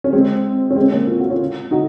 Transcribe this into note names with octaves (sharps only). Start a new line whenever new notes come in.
C#4
G#3 C4
C#4
G#3 C4
A#3 C#4
F4
F#4
C#4 F4
D#4 F#4